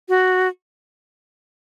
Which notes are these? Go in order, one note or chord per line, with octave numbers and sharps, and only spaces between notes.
F#4